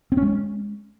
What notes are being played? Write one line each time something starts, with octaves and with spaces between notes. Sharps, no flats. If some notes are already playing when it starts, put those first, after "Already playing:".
C4
C#4
G#3